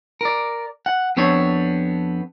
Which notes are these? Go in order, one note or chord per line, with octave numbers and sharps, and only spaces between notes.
A#4 D5
F#5
F2 B3 C4 D4 C#5